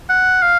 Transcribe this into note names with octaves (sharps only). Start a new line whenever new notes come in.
F#5
F5